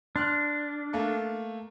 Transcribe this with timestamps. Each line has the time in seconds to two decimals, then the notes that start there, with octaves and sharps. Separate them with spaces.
0.16 D4 C6 F6 F#6
0.93 A3 A#3 A4